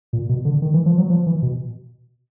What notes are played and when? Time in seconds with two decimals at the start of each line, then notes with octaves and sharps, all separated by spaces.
0.13 A#2
0.29 B2
0.45 D3
0.62 D#3
0.74 E3
0.86 F3
0.98 F#3
1.10 F3
1.27 E3
1.42 B2